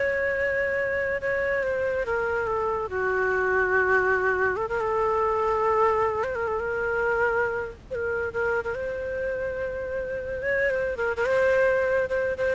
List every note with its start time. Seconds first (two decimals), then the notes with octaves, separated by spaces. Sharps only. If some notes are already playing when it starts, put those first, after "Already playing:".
Already playing: C#5
1.21 C#5
1.63 C5
2.06 A#4
2.47 A4
2.90 F#4
4.57 A4
4.69 A#4
4.80 A4
6.24 C5
6.35 A#4
6.47 A4
6.60 A#4
7.91 C5
7.95 A#4
8.33 A#4
8.64 A#4
8.75 C5
10.42 C#5
10.70 C5
10.97 A#4
11.17 A#4
11.26 C5
12.09 C5
12.38 C5